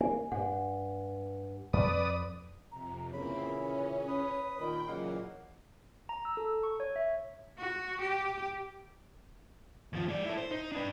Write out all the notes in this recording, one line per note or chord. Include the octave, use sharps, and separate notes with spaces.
A#3 G#5
G2 F#5 G#5
F2 B4 D5 D#6
F2 C3 A#5
A#2 C#3 E3 A#3 C4 C#5 B5
C#4
B4 D#6
A#2 D#3 G5 B5
A#2 C#3 E3 F#3 A#3 D#5 F5 F#5
A#5
E6
A4
C#6
C#5
E5
F#4
G4
D#2 F3
G#3 D5
E4 A4
C5
D#4
D4 B4